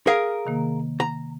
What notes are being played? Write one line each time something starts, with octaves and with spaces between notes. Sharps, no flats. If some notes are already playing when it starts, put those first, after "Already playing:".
G#4 A#4 F5
C3 D#3 A#3
A#5